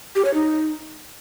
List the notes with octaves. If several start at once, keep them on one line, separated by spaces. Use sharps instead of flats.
G4
C#5
D#4